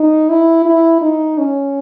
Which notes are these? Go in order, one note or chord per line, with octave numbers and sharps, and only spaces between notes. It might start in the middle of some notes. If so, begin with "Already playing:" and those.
Already playing: D#4
E4
E4
D#4
C#4